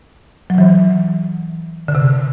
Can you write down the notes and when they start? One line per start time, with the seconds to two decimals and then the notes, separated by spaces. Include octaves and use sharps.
0.50 F#3
0.58 E3
1.88 D3
1.95 C3